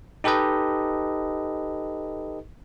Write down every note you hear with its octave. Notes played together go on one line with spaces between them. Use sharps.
D#4 G4 A4 B4 D#5